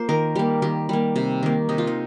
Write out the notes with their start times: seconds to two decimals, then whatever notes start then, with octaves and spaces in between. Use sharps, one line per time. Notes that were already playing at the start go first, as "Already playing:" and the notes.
Already playing: A#3 F4 C5
0.09 D#3 A#4
0.36 G3 A#3 G4
0.62 D#3 G4
0.89 G3 A#3
1.16 C3
1.43 D#3 A#3
1.69 C3 D#4
1.78 F4
1.87 D#4